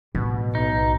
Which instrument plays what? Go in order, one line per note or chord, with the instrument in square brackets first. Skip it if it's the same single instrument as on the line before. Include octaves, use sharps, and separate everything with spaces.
[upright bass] A1 [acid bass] B2
[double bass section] B1 [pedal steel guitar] D#4